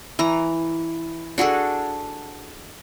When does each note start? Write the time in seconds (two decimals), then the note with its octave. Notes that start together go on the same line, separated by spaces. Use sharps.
0.19 E3 A#5
1.38 D4 F#4 G#4 A4